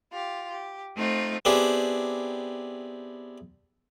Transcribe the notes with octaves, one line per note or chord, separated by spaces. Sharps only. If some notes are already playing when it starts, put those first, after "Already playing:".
F4 G4
G4
A3 C4 D#4 F4
B3 C4 D4 E4 G4 G#4